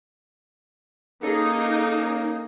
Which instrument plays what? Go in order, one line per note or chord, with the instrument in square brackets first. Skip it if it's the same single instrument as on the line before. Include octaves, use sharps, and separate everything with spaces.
[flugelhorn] A#3 [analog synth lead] C#4 [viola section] D#4 [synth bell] G#4 A4